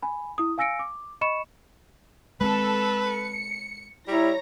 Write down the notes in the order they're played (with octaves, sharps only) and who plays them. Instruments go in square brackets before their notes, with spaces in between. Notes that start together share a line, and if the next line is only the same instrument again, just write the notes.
[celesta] G#5 B5
E4 D#6
F5 G#5 E6 A#6 C#7 D7
D6
D#5 B5 C#6 C#7 E7
[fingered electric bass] G#3 C4 [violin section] A4 E6 [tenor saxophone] B4
[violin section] C#7
[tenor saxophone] G3 [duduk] E4 [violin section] C#5 A#5 A#6